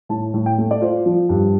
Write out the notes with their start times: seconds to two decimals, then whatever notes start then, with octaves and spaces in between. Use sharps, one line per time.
0.09 A2 A5
0.34 A2
0.46 G5
0.58 A3
0.71 D5
0.82 F4 C5
1.06 F3
1.29 G2